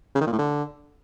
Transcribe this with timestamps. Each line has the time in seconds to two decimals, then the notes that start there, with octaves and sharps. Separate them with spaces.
0.15 C#3
0.21 D#3
0.27 A#2
0.33 A2
0.39 D3